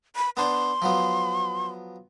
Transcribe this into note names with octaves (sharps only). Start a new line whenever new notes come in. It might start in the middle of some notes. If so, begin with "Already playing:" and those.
B5
B3 D4 C6
F3 F#3 B3